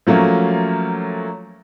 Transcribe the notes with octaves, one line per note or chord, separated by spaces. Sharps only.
F3 F#3 A3 A#3 C#4